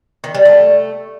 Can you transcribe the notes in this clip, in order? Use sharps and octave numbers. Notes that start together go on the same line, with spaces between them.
D#3
G3
A3